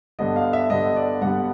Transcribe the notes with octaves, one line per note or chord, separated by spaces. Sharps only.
G2 D3 G3 B3 D#5
F5
E5
G2 D3 G3 B3 D#5
D5
G2 D3 G3 B3 F#5